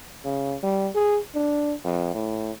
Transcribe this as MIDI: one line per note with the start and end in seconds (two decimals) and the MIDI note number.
0.25 0.56 49
0.63 0.89 55
0.95 1.19 68
1.35 1.74 62
1.85 2.13 41
2.14 2.51 45